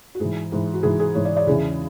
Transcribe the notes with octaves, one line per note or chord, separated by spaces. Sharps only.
F#4
G#2 E3 G#4
G#2 E3
F#4
G#2 E3 G#4
G#4
G#2 E3 C#5
D5
D5
E2 C#3 E3 G#4